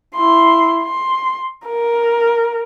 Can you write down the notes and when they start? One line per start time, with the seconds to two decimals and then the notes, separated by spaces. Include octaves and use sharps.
0.16 E4 C6
0.82 C6
1.66 A#4